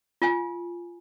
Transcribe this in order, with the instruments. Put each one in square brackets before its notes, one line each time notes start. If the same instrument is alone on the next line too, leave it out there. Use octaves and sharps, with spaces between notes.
[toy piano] F4 G#5